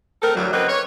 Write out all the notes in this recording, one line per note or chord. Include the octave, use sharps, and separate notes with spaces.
A3 C4 A4 A#4
D2 G2 E3 F#3
C#3 A#3 C4 B4 D#5 F#5
C#5